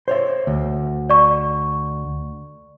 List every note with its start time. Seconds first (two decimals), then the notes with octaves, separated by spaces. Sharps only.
0.08 C5 C#5 E5
0.47 D2
1.10 D5 C#6